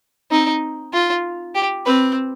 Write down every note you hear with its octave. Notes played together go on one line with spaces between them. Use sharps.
C4 D#4
F4
G4
C4 B4